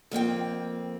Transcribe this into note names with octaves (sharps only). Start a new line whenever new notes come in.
F2 A#3 C4 G5